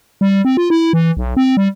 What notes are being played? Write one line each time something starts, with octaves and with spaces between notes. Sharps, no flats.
G3
C4
F4
E4
E3
B1
C4
G3